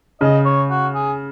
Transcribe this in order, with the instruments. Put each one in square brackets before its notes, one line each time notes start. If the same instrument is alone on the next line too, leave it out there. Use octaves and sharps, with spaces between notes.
[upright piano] C#3 [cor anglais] D#5
[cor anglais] C#5
F#4
G#4